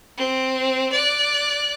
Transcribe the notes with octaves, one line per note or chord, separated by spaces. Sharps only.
C4
D5 F#6